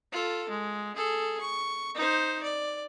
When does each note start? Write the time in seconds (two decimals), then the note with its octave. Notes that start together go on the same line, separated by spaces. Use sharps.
0.12 F4 A4
0.49 G#3
0.96 G#4 A4
1.40 C#6
1.95 D#4 C5
2.43 D5